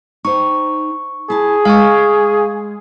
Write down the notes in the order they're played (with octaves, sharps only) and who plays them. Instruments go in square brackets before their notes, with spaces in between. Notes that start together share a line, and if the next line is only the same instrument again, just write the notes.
[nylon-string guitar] D#4 C5 G5 [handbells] C#6
[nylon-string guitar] E4 A5 [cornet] G#4
[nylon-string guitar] G#3 [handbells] F5 G#5 C#6